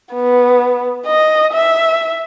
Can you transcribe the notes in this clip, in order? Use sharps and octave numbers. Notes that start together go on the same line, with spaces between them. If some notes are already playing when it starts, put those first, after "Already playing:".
B3
D#5
E5